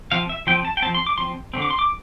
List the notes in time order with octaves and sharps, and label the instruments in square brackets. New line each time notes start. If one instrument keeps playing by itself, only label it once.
[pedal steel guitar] F3 C4 F5
E5
F3 C4 G5
A5
G5
C4 A5
F3
C6
D6
F3 C4 C6
D3 A3 C4
D6
C6
D6